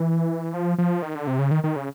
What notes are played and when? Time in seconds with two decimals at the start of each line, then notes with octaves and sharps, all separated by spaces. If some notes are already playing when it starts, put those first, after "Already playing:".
Already playing: E3
0.54 F3
0.78 F3
1.02 D#3
1.15 D3
1.27 C3
1.39 C#3
1.51 D#3
1.64 D#3
1.76 C#3